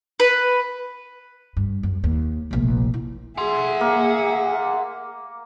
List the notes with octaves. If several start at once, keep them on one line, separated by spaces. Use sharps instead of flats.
B4
G2
F#2
D#2
F1 A#1
E4
G#4 E5 F#5 C6
A#3